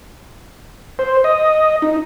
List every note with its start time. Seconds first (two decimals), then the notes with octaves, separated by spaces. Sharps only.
0.99 C5
1.24 D#5
1.82 D#4